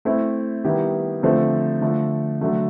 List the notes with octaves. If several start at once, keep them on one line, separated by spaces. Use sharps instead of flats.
A3 C4 E4
D#3 G3 B3 E4 G4
D3 F3 A3 C4
D3 F3 A3
D3 F#3 A3